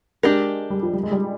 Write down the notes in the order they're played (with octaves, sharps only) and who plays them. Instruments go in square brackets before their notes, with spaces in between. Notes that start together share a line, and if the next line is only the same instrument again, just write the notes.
[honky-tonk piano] G#3 [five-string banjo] D4 G4 A#4
[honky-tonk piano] G3
F3
G3
G#3
G3